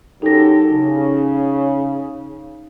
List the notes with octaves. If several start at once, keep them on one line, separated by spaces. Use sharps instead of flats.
F#2 D#4 G4 A4 A#6
C#3